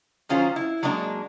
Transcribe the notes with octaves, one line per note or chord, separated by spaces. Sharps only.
D#3 F#3 C#4 F4 G#4 C5
E4
F#3 G#3 A#3 D4 A#4